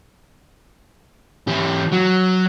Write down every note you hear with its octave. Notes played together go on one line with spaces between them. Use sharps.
E3 G4
F#3